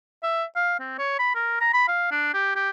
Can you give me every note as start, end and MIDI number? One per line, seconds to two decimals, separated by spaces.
0.23 0.44 76
0.56 0.78 77
0.80 0.96 60
0.98 1.15 73
1.19 1.32 83
1.35 1.59 70
1.61 1.73 82
1.74 1.85 83
1.88 2.08 77
2.12 2.30 62
2.34 2.52 67
2.56 2.70 67